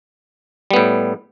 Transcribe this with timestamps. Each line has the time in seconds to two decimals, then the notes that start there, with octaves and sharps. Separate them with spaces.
0.71 G3
0.73 B3
0.76 A2